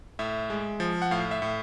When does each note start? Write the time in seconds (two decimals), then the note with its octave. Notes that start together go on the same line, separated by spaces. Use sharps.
0.19 A2 E5
0.50 G#3
0.80 F3
1.02 F#5
1.11 A2 F5
1.31 E5
1.42 A2